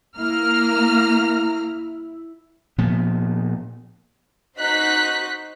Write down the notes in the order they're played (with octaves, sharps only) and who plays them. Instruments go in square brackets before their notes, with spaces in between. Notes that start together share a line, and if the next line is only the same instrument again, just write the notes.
[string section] A#3 A#5 F6 [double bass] E4
[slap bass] A#2 F3 B3
[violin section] D#4 F#4 C5 F#6 B6